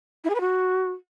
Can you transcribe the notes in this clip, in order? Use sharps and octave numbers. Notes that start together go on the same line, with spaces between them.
E4
G#4
B4
F#4